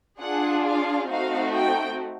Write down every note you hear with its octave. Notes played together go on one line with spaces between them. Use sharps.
D4 F4 G#4 F#5
F5
A3 C4 D#4 F#4 F5
G5